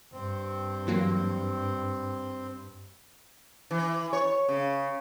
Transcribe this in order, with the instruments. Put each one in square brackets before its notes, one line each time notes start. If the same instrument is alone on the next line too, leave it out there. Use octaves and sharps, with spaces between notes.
[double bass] G2 [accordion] C4
[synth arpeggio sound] E3 F#3 A#3
[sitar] E3
C#5
C#3